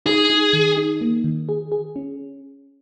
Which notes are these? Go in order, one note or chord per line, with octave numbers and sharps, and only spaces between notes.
D#4 G#4
D#4
D#3
D#4
A#3
D#3
G#4
G#4
C#4